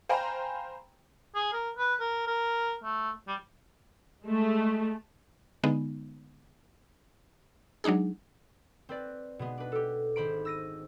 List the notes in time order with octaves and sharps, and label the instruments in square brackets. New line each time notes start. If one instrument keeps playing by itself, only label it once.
[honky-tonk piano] C5 F5 G5 G#5 A#5 B5
[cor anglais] G#4
A#4
B4
A#4
A#4
A3
G3
[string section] G#3 A3
[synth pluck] D3 G#3 B3 D#4
F#3 G#3 D4 D#4 G#4
[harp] C4 B4 D5
B2 G#3 B3
D4 B4
G4 A4
G#1 C5 B5 D7
E6 A#6 D#7